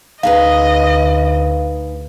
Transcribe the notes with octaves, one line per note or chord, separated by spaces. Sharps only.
D2 D#4 G#4 B4 D#5 F5